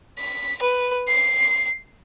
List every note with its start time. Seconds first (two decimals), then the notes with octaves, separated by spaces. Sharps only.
0.18 B6
0.62 B4
1.08 C7